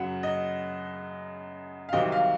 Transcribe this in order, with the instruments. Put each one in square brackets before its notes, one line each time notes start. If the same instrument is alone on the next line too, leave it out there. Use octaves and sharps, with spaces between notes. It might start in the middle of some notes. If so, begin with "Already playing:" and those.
Already playing: [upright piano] F#2 C#3 F#3 F#5
D#5
F5
C2 C3 D#3 F#3 C4 D#5
F5